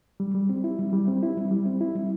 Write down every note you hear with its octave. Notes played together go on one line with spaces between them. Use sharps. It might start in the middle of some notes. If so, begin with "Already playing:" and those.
G3
G3
C4
E4
G3
G3
C4
E4
G3
G3
C4
E4
G3